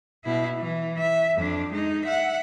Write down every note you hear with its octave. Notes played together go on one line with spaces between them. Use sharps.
B2 E4
E3
E5
F2 D4
G#3 D#4
E5 F#5